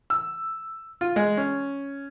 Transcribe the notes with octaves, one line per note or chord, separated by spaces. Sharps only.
E6
F4
G#3
C#4